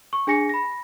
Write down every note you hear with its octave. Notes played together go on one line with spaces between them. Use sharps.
C#6
D4 G#4 G#5 A#6 C#7
B5 A#6